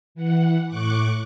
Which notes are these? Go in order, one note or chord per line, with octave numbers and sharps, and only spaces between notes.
E3 F#5
A2 C#6 D6 F#6